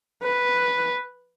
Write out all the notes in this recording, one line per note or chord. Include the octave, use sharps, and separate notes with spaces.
B4